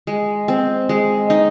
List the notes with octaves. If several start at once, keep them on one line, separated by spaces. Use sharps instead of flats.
G#3
C4
G#3
D#4